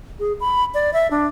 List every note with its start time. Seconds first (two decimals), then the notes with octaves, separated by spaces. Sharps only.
0.19 G#4
0.40 B5
0.74 D5
0.93 E5
1.11 D4